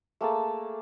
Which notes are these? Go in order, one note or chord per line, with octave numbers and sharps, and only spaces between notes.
A3 A#3 G#4 A5